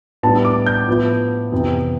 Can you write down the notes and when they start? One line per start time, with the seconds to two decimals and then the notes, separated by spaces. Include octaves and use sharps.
0.23 A2 G3 B3 D4 A5
0.45 D6
0.66 G6
0.88 A2 F3 B3 E4
1.52 F2 C3 E3 B3